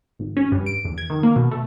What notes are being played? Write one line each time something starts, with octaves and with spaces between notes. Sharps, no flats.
G#1
C#4
G2
D7
E2
G#6
D#3
A#3
B2
A3